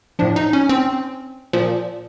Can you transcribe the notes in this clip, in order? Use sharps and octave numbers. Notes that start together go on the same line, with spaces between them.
A2 F3 D4
D#4
C#4
C4
A#2 F3